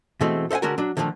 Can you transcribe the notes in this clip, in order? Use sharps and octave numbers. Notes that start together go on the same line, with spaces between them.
B2 E3 G#3 A3 C4
A4 C5 D#5 F#5 G#5
D3 G#3 C#4 F#4 A#4
F#3 D4
D3 D#3 F3 F#3 A3